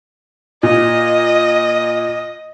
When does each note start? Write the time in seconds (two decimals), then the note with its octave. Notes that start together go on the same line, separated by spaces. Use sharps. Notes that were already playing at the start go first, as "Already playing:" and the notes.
0.63 A#2 D#5